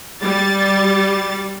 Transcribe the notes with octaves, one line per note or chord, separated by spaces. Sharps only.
G3 A6